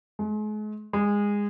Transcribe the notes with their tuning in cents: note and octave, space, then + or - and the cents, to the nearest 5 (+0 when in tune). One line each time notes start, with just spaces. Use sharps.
G#3 +40
G#3 -20